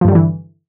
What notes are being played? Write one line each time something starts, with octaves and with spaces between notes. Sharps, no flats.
G2 D3 E3 F3 G3